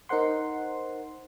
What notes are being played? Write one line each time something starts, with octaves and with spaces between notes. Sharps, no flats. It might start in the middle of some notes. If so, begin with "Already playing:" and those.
D#4 A#4 C5 F#5 C6